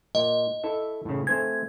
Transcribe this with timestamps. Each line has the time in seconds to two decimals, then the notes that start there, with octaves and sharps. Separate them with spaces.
0.15 A#2 D#5
0.63 E4 A4 E5
1.05 A2 C#3
1.27 A3 C4 G#5 G#6